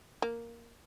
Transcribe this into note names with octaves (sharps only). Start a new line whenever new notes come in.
A#3